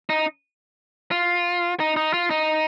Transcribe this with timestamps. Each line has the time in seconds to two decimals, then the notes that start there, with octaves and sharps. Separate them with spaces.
0.10 D#4
1.11 F4
1.80 D#4
1.97 D#4
2.13 F4
2.30 D#4